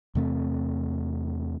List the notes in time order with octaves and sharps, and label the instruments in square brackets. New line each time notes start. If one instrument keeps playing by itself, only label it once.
[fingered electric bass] E2 C3 A3 C4